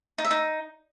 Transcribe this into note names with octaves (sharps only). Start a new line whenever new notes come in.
D#4
E5
D#4